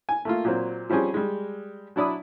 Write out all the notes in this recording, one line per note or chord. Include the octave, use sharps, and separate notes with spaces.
G#5
A3 A#3 F4
A#2 F#3 C4
F3 G3 C4 C#4 G#4
G3 G#3
F#3 D4 E4 D5 B5 D#6